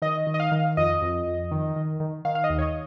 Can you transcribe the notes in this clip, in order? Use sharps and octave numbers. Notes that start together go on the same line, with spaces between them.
D#3 D#5
D#3
D#5
F5
D#3
F2 D#5
F2
F2
D#3
D#3
D#3
D#3 F5
F5
D#5
D#2
C#5
D#5